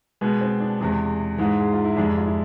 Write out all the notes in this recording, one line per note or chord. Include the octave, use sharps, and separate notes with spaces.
B2 G#3 B3
C4
D4
E2 C3 G#3
G#2 E3 G#3
G#4
F4
E4
F2 C3 G#3 D4
F4
E4